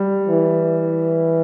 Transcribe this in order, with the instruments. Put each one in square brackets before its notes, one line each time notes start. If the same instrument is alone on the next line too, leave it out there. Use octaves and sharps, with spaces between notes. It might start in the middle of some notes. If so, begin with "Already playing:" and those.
Already playing: [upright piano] G3
[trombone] E3